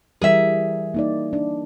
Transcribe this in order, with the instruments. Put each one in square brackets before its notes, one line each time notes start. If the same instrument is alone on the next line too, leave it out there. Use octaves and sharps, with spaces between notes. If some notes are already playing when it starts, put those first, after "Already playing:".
[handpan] E3 G3 A#4 [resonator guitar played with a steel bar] G#4 E5
[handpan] A#3 D#4 D5
D4